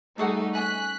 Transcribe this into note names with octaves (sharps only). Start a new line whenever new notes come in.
G3 A3 D#4 F#4 G#4 F#5
C#4 D4 G#5 F#6 B6